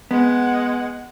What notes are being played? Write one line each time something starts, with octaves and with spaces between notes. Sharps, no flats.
G#3 B3 F#5